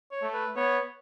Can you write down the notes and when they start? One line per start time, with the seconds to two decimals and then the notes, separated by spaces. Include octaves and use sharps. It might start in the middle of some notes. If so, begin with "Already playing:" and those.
0.11 C#5
0.22 A3
0.34 B4
0.56 B3 C#5